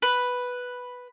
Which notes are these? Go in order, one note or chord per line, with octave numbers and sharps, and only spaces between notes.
B4